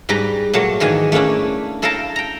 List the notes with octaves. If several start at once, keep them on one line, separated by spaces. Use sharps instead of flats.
G#2 G3 G4 B4 A#5
A#2 F#3 A3 C#5
G#2 D#3 E3 A#3 G#5
A3 A#3 C#4 D4 E4
E4 A4 F5 G5 A5 A#5
G5 A#5